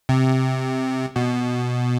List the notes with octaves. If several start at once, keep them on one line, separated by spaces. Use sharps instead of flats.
C3
B2